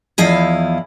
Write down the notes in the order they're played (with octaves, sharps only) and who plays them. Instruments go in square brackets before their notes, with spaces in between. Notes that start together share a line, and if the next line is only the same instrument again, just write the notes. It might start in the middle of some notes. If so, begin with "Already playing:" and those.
[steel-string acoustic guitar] E2 F3 E4 D#5 F5